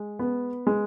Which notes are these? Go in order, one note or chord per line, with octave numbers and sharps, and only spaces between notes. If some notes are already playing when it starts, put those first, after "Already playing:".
Already playing: G#3
B3
G#3